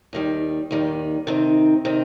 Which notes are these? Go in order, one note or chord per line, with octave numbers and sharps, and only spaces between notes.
D#2 D#3 G3
D#2 D#3 G3
C3 D#3 C4 D#4
C3 D#3 C4 D#4